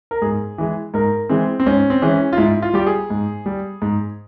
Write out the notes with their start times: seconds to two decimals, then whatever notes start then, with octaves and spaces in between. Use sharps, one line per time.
0.11 A#4
0.22 G#2 G#4
0.58 E3 G#3
0.94 G#2 A#4
1.29 E3 G#3 C4
1.60 C4
1.66 G#2 C#4
1.90 C4
2.02 E3 G#3 C#4
2.33 F4
2.37 G#2 E4
2.62 F4
2.73 G3 G4
2.86 G#4
3.10 G#2
3.46 G3
3.82 G#2